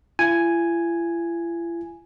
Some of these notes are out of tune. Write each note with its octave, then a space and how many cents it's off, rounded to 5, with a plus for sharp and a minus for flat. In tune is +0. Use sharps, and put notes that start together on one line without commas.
E4 +45 G#5 +0